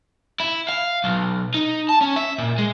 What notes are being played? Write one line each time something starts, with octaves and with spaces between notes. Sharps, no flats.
E4
F5
B1
D#4
A5
C#4
E5
A#2
G#3